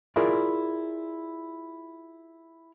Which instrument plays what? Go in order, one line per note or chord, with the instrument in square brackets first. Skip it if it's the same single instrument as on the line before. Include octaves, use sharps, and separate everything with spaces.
[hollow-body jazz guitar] E4 F4 G#4 A#4 D5